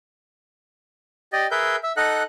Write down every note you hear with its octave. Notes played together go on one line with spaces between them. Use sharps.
G4 D5 D#5
G#4 A#4 B4 E5 G6
E5
D#4 A4 D#5 F#5 F#6